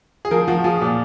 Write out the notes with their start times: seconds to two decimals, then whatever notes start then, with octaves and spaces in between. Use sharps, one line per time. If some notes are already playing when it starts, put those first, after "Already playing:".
0.25 G#4
0.31 F3 A#4
0.48 F3 F#4
0.64 F3 G#4
0.81 A#2